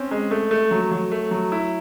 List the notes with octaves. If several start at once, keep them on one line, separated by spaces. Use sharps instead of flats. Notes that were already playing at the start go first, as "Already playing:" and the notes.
Already playing: C4 C#4
G#3
A3
A3
F#3
F#3
A3
F#3
E4